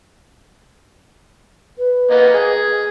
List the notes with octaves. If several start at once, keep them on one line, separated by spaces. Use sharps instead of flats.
B4
A#3 B3 D#5
G#4